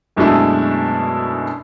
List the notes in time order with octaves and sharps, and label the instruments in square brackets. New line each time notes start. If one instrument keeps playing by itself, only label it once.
[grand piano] F#2 B2 G#3 A3 D4 E4